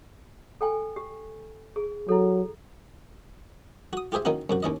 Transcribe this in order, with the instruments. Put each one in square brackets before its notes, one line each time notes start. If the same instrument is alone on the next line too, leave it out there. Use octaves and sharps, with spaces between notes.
[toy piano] A4 G5 G#5
G4
G#4
[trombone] F#3 [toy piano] E4 A4
[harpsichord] F#4 D#6
F4 G4 G#4 C5 E5
D#3 A#3 C#4 D#4 E4 F#4
F#2 C3 F#4
D#2 C#4 E4 D#5